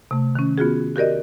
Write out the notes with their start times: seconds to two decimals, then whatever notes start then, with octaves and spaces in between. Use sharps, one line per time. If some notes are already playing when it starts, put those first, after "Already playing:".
0.11 C3 A3
0.35 D#3 C#4
0.58 B3 F4 F#4 G#4
0.96 F#4 G4 A#4 D5 D#5